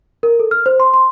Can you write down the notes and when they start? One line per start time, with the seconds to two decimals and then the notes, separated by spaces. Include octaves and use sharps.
0.23 A#4
0.40 A4
0.51 F6
0.66 C5
0.80 C6
0.94 C6